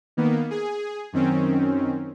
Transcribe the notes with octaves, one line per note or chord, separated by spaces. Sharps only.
D#3 A#3 B3
G#4
F#2 D#3 C4 C#4